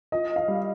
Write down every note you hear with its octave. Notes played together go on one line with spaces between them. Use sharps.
F4 D#5
F5
G3